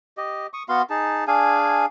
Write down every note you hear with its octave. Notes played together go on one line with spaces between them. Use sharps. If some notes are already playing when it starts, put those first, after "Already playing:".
G4 D#5
C#6 D#6
B3 F#4 F5 C6
D#4 G#4 A5
D4 G#4 F5 G#5